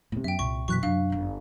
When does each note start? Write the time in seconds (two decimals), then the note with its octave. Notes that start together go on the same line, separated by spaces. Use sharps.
0.12 A2 C3 B3
0.24 F#2 E5 G5
0.39 C2 A#2 C#6
0.68 F#2 B2 E3 F#3 A#3 C#6 F#6 B6
0.83 F#2 C3 F#3 D4 F5
1.10 G1 D#4